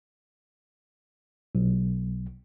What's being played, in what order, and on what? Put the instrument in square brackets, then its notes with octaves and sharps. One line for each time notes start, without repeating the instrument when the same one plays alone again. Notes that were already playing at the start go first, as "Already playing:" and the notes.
[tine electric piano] B1